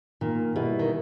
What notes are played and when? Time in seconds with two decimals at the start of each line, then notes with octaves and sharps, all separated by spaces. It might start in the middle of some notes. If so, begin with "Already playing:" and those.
0.21 A#2 D#3
0.55 B2 G3 B3 E4
0.79 D#3